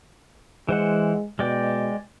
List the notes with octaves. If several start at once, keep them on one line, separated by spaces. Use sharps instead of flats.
E3 G#3 C5 F#5
B2 G#3 D5 G5